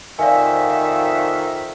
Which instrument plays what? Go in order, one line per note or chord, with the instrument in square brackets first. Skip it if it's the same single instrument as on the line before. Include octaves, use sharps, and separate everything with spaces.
[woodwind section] F2 D#3 E5 [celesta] D5 F5 G#5